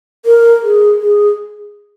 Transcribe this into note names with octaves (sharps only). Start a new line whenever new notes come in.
A#4
G#4
G#4